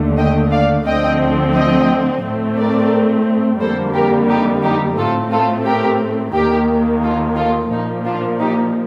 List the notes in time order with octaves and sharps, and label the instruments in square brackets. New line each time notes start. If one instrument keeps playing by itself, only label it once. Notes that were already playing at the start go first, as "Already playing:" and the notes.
Already playing: [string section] D#2 D3 A3
D#5 G5
D5 F5
D2 D3 F3 A3 C4 D#5 G5
D#5 G5
A2 A3 C4
A#4 D5
F2 D3 G3 A#3 A4 C5
G4 A#4
D#4 G4
D#4 G4
A2 A3 C4 F4 A4
F4 A4
G4 A#4
D#2 D#3 A#3 G4 A#4
F4 A4
F4 A4
A#2 F3 A#3 D#4
D4 F4
D#4 G4